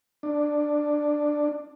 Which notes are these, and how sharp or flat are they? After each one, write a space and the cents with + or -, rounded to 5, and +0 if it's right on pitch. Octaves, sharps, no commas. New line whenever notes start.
D4 +10